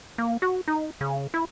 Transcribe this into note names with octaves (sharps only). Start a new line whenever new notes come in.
A#3
F#4
D#4
C#3
E4